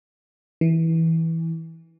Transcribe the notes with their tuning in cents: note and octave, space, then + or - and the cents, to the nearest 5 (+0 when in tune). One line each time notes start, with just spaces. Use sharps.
E3 -15